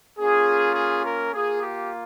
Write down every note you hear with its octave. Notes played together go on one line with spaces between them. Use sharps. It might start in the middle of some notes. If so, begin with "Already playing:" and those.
A#3 C#4 F4 G#4
G#4
A#4
A#3 F4 G#4
G4